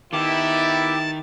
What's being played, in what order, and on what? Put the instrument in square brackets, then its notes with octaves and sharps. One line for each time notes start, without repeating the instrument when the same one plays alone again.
[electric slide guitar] D#3 [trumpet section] B3 E4 [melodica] G4 D6 [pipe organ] A5